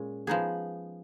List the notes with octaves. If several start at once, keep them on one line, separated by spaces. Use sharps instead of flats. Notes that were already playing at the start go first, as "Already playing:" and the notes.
Already playing: A#2 G#3 C#4
F3 B3 D#4 G#4